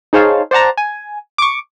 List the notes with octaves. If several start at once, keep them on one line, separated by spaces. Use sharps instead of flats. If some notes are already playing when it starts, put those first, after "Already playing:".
D#4 G#4 C5 C#5 F5 A5
C5 D5 F#5 A5 A#5
G#5
C#6 D6